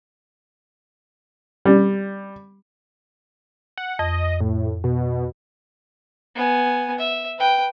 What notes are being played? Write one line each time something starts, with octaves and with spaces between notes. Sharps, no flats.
G3
F#5
F2 D#5
A2
B2
B3 G#5
E5
B4 G5